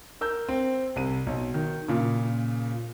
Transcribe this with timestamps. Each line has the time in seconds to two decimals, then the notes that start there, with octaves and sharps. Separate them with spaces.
0.21 A#4 E6 G6
0.49 C4
0.96 C2 D#7
1.27 B1
1.54 D#3
1.88 A#2 C#3